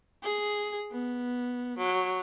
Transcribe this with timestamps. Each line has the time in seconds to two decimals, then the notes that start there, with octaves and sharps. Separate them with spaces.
0.23 G#4
0.92 B3
1.78 F#3